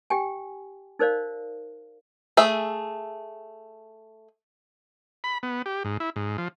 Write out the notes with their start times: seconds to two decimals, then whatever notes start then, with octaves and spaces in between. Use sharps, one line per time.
0.10 G4 G5 G#5
0.99 D#4 A#4 C5 D5 F5
2.37 A3 G#4 E5
5.24 B5
5.43 B3
5.66 G4
5.85 G#2
6.00 E4
6.16 G#2
6.38 F3